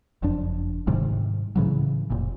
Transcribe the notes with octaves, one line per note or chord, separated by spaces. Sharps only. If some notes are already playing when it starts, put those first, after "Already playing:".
F#1 F2 D4
G#2 C3 D#3 G3
A2 C#3 E3 F#3
F1 A#2